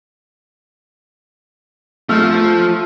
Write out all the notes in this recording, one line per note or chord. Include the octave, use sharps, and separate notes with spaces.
F3 A3 E6 F6